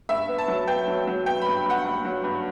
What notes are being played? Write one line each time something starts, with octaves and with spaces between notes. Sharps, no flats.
G2 E5
B3
A5
F#3
B3 G5
F#3
F#3
B3 G5
G2 B5
G2 F#5
G2
F#3
G2